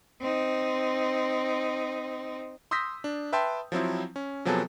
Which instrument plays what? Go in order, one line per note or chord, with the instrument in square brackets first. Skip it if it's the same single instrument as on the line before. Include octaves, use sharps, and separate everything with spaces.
[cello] C4 D#4
[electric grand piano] C6 D#6 E6 G6 A#6 B6
D4
B4 E5 G5 A5 C6
F3 F#3 C4 E4
C#4
C3 F3 F#3 B3 G#4 A4